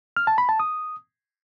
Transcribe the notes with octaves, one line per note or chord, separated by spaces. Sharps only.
F6
A5
B5
A5
D#6